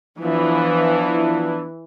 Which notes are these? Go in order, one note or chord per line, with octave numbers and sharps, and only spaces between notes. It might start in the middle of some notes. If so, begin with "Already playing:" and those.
E3 F3 B3 D4 F4